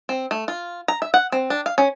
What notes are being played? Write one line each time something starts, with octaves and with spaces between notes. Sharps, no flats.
C4
A3
F4
A#5
E5
F#5
C4
D4
F5
C#4